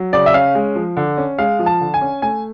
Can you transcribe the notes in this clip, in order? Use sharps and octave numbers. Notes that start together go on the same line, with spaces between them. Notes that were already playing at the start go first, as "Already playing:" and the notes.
Already playing: F#3
C#3 D5
E5
C#4 F5
G#3
F3
D3
C#4
G#3 F5
F3
A5
D3
G#5
C#4
A3 G#5